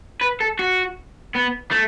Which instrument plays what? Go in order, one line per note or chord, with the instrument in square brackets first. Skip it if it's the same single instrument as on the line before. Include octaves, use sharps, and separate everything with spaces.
[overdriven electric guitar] B4
A4
F#4
B3
A3